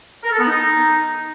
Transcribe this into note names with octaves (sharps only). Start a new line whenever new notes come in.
A#4
A4
B3
D#4